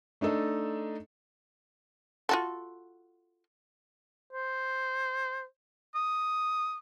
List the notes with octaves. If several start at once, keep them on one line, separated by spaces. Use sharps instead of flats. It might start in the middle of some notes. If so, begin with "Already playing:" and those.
A3 D4 D#4 A4 D#5
F4 F#4 A4
C5
D#6